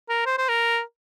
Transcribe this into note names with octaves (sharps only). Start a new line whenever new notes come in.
A#4
C5
C5
A#4